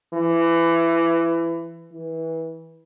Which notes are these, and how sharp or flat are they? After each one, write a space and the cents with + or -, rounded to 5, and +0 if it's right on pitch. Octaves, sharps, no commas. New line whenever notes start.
E3 +20
E3 -20